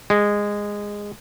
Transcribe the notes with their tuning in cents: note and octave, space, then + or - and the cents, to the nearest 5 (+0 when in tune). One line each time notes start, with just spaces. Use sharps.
G#3 -15